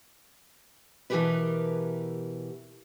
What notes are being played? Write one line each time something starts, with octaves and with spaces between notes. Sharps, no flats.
B2 E3 F#3 G4 A#4 B4